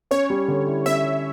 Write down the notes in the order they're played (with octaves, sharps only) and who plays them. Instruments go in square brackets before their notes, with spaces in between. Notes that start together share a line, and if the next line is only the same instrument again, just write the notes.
[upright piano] C#4 [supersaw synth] C#5
[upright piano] G3
D3
E4
[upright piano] C#4 [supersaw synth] E5
[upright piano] G3